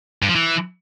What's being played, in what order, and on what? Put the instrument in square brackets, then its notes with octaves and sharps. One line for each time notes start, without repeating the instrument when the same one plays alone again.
[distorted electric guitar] G2
F3
E3